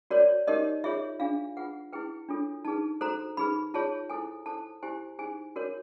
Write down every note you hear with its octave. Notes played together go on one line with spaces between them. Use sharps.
F#4 A#4 C#5 D5
D#4 G4 A#4 C#5 D#5
F4 G#4 C#5 E5
D4 F4 G#4 F5
F4 G#4 B4 F#5
E4 G#4 B4 G5
D4 F4 A4 C#5
D#4 G#4 B4 A5
F#4 A4 C5 A#5
D#4 G#4 B4 B5
F4 G#4 C#5 A5
E4 A4 C5 G#5
E4 A4 C5 A5
E4 G4 C5 G#5
D#4 G#4 C5 G#5
F#4 A#4 C#5